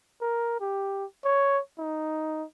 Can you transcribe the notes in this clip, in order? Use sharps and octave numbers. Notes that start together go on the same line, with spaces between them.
A#4
G4
C#5
D#4